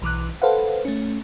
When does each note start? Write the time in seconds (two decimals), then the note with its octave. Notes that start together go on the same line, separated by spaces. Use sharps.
0.02 B1 E3 D6 F#6
0.42 A4 B4 C5 F5 F#5
0.85 A3 C#4